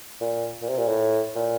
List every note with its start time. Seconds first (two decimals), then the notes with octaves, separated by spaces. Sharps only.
0.21 A#2
0.62 A#2
0.68 C3
0.78 A#2
0.88 A2
1.35 A#2